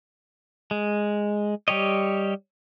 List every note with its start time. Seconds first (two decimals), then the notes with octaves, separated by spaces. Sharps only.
0.71 G#3
1.68 G3 G4 C#5 D#5